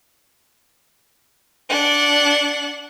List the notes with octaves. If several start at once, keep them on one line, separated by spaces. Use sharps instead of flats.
D4 F#5